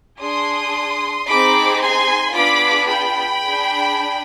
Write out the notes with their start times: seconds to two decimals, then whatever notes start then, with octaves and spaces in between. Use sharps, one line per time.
0.21 D4 G#4 C6 D#6
1.28 C4 D#4 G#4 B5 D6
1.81 G#5 C6
2.35 B3 D4 F4 G#4 B5 D6
2.89 G5 B5
3.42 D4 G#4